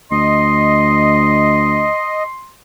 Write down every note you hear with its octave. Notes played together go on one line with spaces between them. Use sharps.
D2 D#5 C6